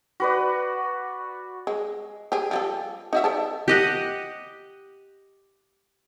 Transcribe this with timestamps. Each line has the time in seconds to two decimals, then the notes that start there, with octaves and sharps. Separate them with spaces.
0.20 F#4 B4 D5
1.67 G#3
2.32 G4 G#4
2.51 F3 G3 A4
3.13 D#4 F#4 E5
3.24 A4 D5 A5
3.68 G4 D#5 F#5